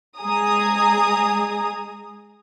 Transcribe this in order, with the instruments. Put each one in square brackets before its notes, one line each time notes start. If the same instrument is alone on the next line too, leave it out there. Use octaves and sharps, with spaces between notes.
[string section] G#3 G#4 G#5 A#5 D#6